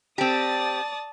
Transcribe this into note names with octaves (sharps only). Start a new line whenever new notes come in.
C4 G4 D5 A5 D#6